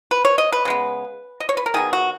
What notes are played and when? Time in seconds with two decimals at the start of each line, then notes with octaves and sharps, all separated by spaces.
0.11 B4
0.25 C#5
0.38 D#5
0.52 B4
0.65 C#3 G#3 B3
1.40 D#5
1.49 C#5
1.57 B4
1.66 A#4
1.74 D#3 F#3 B3 G#4
1.93 F#4